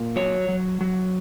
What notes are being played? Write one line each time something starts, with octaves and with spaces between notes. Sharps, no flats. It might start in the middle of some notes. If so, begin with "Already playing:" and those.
Already playing: A#2
F#3 C#5
F#3
F#3